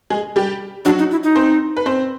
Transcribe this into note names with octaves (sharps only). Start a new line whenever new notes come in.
G#3 G#4
G3 G4
F#3 D4 F#4
D#4
E4
D#4
C4 C5
B4
C4 C5